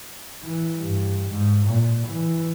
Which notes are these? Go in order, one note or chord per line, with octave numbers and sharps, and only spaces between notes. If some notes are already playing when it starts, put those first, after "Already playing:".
E3
G2
G#2
A#2
E3